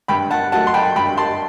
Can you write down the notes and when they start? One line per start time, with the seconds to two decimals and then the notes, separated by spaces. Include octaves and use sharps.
0.08 G2 G5 B5
0.31 F#5 A5
0.52 F#3 F#5 A5
0.56 A3
0.67 C6
0.74 G5 B5
0.96 G2 G5 B5
1.17 A5 C6